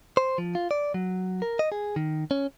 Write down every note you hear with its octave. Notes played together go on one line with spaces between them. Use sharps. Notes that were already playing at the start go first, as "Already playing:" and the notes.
C5
F3
F4
D5
F#3
A#4
D#5
G#4
D#3
C#4